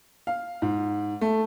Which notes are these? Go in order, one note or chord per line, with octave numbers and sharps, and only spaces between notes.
F5
G#2
A3